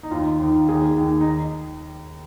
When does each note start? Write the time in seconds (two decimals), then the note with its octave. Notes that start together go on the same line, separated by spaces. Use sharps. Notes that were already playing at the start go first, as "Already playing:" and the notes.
0.03 D#4
0.11 D#2 D#3 F4
0.40 D#2 D#3
0.69 D#2 D#3 G#4
0.98 D#2 D#3
1.21 D#4